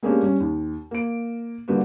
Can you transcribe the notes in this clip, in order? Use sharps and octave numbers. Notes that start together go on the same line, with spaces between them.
G#3 A#3 B3 C#4 D4 G4
G3 C#4
D#2
A#3 D7
D3 G3 A#3 F#4 G4 B4